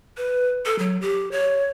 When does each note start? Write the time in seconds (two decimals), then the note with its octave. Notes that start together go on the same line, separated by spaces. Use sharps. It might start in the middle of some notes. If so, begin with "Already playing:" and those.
0.17 B4
0.66 A4
0.79 F#3
1.01 G4
1.31 C#5